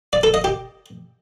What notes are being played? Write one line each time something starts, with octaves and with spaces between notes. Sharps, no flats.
D5
A4
D#5
G4